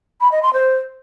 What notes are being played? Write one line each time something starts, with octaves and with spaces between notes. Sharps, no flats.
B5
D#5
C6
C5